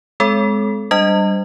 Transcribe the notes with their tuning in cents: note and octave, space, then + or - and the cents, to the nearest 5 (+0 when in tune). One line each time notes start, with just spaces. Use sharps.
G#3 +0 C4 -35 A4 -20
G3 -10 D4 +0 D#5 +0